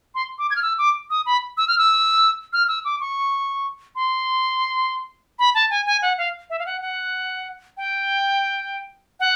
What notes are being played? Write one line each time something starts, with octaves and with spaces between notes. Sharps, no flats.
C6
D6
G#6
F6
E6
D6
D#6
B5
E6
F6
E6
F6
E6
D6
C#6
C6
B5
A5
G#5
G#5
F#5
F5
E5
F5
F#5
F#5
G5
F#5